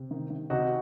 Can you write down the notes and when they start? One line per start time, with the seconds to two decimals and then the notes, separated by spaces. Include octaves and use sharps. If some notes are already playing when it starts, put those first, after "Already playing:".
Already playing: C3
0.11 D#3
0.30 D#3
0.50 C3 D#4 F#4